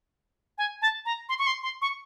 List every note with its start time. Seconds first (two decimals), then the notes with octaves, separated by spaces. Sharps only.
0.58 G#5
0.82 A5
1.05 A#5
1.29 C6
1.39 C#6
1.47 C6
1.63 C6
1.82 C#6